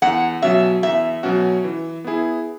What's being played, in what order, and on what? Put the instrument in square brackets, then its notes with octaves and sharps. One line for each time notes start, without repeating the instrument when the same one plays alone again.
[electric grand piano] E2 [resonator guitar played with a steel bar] F#5
[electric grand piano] B2 F#3 C#4 F#4 [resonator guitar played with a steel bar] E5
[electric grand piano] E2 [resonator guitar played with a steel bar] E5
[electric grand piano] B2 F#3 C#4 F#4
E3
B3 E4 G#4